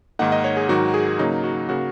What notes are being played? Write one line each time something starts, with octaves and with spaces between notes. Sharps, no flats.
G#2 D#3 A#3 D#4 F#5
D#5
C#5
G#4
G#2 D#3 F#3 D#4 F#4
G#4
C#3 F#3 A#3 D#4
F#4
C#3 A#3 F#4